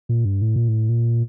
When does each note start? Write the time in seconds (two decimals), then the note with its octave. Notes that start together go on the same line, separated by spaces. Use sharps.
0.09 A#2
0.25 G2
0.42 A2
0.56 A#2
0.68 A2
0.89 A#2